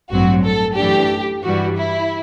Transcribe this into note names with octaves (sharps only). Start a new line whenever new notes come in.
A1 G2 F#3 C4 F#4
A4
F#2 E3 A3 D4 G4
G2 E3 G3 F#4
E4